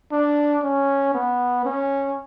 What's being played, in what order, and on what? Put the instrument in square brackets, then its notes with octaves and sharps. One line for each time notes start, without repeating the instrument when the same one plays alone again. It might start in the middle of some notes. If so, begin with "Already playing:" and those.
[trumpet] D4
C#4
B3
C#4